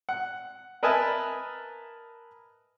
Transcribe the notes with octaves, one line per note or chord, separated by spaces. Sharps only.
F#5
A#4 B4 D#5 E5 G#5 A5